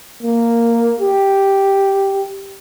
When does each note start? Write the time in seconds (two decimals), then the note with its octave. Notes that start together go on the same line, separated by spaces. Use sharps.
0.23 A#3
1.00 G4